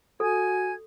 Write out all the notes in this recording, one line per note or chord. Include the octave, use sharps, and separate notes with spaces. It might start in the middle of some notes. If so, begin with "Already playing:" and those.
F#4 A4 G#5 G#6